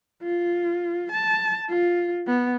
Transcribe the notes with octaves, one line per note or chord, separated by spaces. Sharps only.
F4
A5
F4
B3